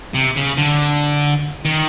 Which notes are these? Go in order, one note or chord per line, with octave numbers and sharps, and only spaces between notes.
C3
C#3
D3
D#3